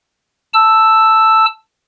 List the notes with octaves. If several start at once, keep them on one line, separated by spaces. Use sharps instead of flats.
A5 E6